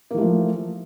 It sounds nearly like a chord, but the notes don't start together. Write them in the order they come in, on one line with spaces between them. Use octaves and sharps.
A#3 E3 A3 F3